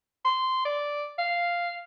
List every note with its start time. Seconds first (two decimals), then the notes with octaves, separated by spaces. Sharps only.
0.25 C6
0.65 D5
1.18 F5